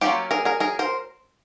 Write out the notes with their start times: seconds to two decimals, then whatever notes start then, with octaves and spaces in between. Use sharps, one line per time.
0.01 F#3 A#3 C#4 F4 G4
0.31 G#4 A#4
0.45 G#4 A#4
0.60 G#4 A#4
0.79 A#4 C5